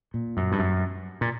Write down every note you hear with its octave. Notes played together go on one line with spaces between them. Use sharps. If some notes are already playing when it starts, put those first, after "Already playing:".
A#2
F#2
G2
F#2
A#2